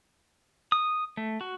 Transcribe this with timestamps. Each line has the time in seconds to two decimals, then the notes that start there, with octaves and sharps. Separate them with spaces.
0.72 D#6
1.17 A3
1.41 F#4